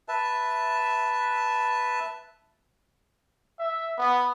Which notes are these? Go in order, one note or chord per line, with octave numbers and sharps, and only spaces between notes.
B4 E5 A5
E5
B3